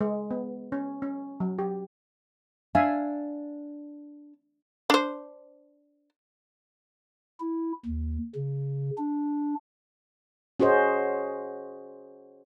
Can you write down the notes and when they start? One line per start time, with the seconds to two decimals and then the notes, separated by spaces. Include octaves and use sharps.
0.01 G#3
0.31 B3
0.72 C#4
1.02 C#4
1.40 F#3
1.59 G4
2.75 D4 E5 F5 G#5
4.90 D4 C5
7.40 E4
7.85 D#2
8.35 C#3
8.97 D4
10.60 C#4 F#4 G#4 C5 D#5